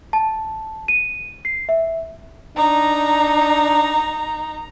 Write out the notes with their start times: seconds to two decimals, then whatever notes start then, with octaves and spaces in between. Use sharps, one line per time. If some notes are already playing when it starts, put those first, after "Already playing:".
0.13 A5
0.88 D#7
1.45 C7
1.69 E5
2.57 D4 D#4 A#5